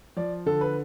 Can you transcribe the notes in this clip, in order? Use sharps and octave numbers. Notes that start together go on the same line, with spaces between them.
F3 D5
D3 A4
B4